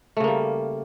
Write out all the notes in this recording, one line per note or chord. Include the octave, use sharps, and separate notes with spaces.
C#3 G3 A3 A#3